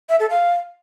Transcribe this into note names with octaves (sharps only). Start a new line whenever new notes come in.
E5
A4
F5